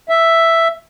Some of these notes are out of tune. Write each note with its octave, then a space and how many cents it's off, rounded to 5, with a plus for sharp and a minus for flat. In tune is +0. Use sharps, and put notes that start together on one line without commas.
E5 +5